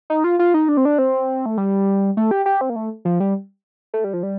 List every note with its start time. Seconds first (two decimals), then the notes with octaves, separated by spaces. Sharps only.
0.10 D#4
0.24 F4
0.39 F4
0.54 D#4
0.69 D4
0.77 C4
0.85 D4
0.98 C4
1.46 A3
1.57 G3
2.17 A3
2.31 G4
2.46 G4
2.61 C4
2.70 A#3
2.76 A3
3.05 F3
3.20 G3
3.94 A3
4.04 G3
4.13 F3
4.23 G3